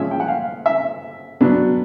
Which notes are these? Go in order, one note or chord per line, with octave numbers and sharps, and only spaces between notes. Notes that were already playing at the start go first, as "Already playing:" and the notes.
Already playing: A#2 F3 G#3 C#4 E5
G5
F#5
F5
E5
B2 F#3 B3 D4